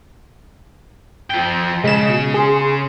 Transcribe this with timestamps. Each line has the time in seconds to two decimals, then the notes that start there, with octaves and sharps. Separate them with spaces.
1.30 F3 G5
1.84 C#3 G#3 E7
2.09 B2
2.34 G#4 C6